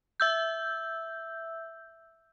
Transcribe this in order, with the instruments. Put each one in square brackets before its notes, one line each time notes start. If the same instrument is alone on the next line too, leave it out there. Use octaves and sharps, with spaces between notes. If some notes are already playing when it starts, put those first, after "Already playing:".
[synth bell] E5 E6 G6